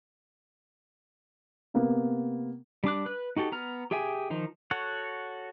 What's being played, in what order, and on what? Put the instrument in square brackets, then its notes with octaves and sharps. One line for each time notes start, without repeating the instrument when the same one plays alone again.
[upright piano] C3 A#3 B3
[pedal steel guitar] G3 D4 D6 F#6
B4 F#6
D#4 F#4 G4 A4
B3 A#5 F6
G4 G#4 E5 G5 G#5
D#3 F3 D#4
F#4 A4 C#5 F#5